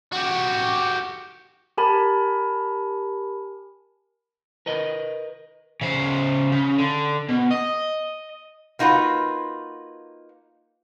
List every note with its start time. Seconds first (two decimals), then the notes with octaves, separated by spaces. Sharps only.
0.13 F#4 G4
1.78 G4 A#4 G#5 A5 B5
4.66 A#4 B4 D#5
5.81 C#3 C5
6.52 C#3
6.78 D3
7.29 B2
7.51 D#5
8.79 A#3 D#4 F4 F#4 B4